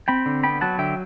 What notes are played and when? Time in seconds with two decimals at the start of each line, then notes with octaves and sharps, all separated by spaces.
0.08 C4 G5 B5
0.26 D3
0.43 B3 G5 B5
0.61 F#3 F#5 A5
0.78 D3 E5 G5